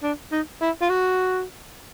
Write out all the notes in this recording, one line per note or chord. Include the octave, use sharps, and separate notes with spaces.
D4
D#4
E4
F4
F#4